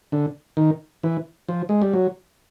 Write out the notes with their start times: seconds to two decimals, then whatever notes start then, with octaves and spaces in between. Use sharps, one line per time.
0.12 D3
0.57 D#3
1.03 E3
1.49 F3
1.69 G#3
1.82 G3
1.93 F#3